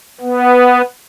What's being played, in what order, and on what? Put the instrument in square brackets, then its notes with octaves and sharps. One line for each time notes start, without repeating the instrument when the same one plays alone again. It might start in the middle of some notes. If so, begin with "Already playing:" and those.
[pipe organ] B3